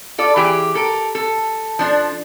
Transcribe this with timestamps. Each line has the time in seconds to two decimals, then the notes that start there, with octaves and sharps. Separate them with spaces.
0.18 F4 A4 D5
0.36 E3 G4 G#4
0.75 A4 A#4
1.15 A4
1.79 F3 D4